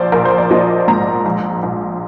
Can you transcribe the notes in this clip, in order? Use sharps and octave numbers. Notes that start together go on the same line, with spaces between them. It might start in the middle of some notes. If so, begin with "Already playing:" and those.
Already playing: A#1 C5 D5
A#1 A#4
C5
D5
F3 D#5
G#2 A#5
A#1
A#1